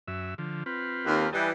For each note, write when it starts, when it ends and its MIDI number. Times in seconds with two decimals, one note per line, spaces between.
0.08 0.34 42
0.08 0.34 76
0.38 0.64 50
0.38 0.64 53
0.66 1.30 60
0.66 1.30 65
0.66 1.30 71
1.06 1.27 39
1.33 1.50 52
1.33 1.50 55
1.33 1.50 75
1.33 1.50 79
1.33 1.50 81